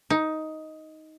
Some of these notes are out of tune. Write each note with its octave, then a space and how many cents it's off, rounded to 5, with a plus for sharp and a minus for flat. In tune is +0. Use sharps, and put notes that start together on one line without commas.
D#4 +10